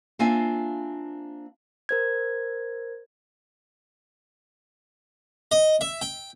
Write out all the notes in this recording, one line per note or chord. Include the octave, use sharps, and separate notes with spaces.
A#3 C4 D4 F4 E5 G#5
A#4 C5 G#6
D#5
E5
G5